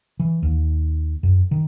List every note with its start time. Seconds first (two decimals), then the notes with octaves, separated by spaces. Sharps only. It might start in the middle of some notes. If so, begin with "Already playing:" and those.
0.20 E3
0.43 D#2
1.23 F#2
1.51 D#3